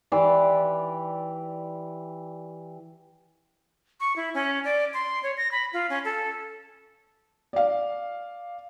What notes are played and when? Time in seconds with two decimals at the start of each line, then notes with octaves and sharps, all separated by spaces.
0.12 E3 G4 D5 C6
4.00 C#6
4.16 E4
4.34 C#4
4.65 D5
4.94 C6
5.23 C#5
5.37 A#6
5.51 B5
5.73 F4
5.90 C#4
6.05 A4
7.53 D5 F5